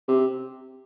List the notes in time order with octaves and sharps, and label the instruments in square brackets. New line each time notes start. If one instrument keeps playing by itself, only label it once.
[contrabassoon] C3